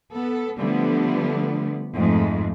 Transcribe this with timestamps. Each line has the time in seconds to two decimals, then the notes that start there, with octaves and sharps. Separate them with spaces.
0.12 B3 A4
0.58 D3 F3 G3 A3 B3
1.94 F2 G#2 G#3 A3